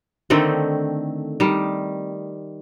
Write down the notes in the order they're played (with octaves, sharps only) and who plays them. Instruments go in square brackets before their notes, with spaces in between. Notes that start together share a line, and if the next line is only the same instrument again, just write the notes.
[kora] D3 D#3 A3 C4
D#3 G3